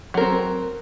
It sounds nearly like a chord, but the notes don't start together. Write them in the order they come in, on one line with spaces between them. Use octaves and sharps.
F#3 A#4 C4